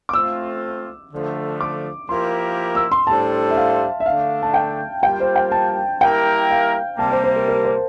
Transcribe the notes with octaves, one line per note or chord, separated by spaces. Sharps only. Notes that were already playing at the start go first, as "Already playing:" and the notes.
D6
A3 C4 F4 E6
D3 F3 A3
D6
F3 A#3 E4 G4 A#4 C6
E6
C6
A2 G3 D4 A4 C5 A5
E5
F5
E5
D3 A3 D4 F5
A5
G5
G3 A#3 F4 G5
C5
G5
A5
G3 A#3 E4 A#4 G5
F5
C3 G3 A#3 A5
C5
C5
A#4
A#4
C5